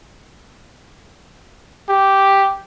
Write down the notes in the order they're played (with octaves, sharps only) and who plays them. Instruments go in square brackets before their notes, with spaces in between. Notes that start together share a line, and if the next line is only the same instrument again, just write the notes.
[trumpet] G4